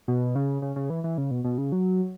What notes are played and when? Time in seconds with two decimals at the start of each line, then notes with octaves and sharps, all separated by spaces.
0.08 B2
0.35 C#3
0.62 C#3
0.76 C#3
0.90 E3
1.04 E3
1.18 C#3
1.31 B2
1.44 B2
1.58 C#3
1.72 F#3